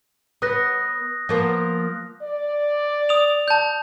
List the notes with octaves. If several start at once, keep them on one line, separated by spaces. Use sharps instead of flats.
B3 B4 D#6 F#6 A#6
F3 A#3 B3
D5
D#6 F7
A5 G6